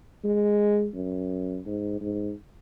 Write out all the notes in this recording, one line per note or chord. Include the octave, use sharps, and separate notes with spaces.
G#3
F#2
G#2
G#2